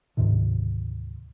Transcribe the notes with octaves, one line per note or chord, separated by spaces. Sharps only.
D2 G#2 C3 D#3